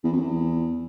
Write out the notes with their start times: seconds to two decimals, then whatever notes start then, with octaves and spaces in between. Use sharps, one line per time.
0.04 E2
0.12 F2
0.19 E2